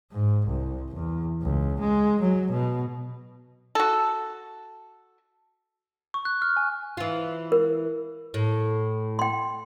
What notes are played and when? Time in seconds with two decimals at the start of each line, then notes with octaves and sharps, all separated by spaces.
0.12 G#2
0.47 C2
0.94 E2
1.42 C#2
1.80 G#3
2.21 F#3
2.51 B2
3.75 F#4 A4
6.14 C#6
6.25 F#6
6.42 F6
6.57 G#5
6.97 E3 F4
7.52 A#4
8.34 A2
9.19 G5 C6